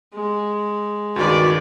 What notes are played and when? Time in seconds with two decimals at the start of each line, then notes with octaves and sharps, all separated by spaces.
0.14 G#3
1.16 C#2 G2 D#3 F#4 B4 D5